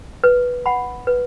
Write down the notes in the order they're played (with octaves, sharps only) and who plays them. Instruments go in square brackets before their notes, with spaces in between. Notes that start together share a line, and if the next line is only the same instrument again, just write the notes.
[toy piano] B4
F#5 B5
B4